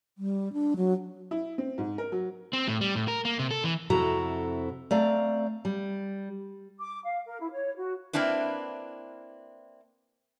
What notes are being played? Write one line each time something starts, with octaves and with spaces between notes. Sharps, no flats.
G3
D4
F#3
E4
C4
G#2
A#4
F#3
C4
A2
G3
A2
A#4
A#3
C3
A4
E3
F2 C3 E4 F#4 A4 A#5
A3 C4 D5 F5 A#5
G3
D6
F5
A#4
E4
C#5
F#4
A#3 C4 D4 E4 B4